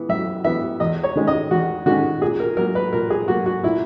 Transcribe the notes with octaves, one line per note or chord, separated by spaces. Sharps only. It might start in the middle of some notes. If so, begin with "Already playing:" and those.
Already playing: E3 B3
F#2 E5
E3 B3 E5
E2 D#5
C#5
D#3 G#3 C#4
D#5
E2 F#4
D#3 G#3 C#4 F#4
A#2 G#4
A#4
F#3 A#3 A#4
B4
A#2 A#4
G#4
F#3 A#3 F#4
F#4
A#2 E4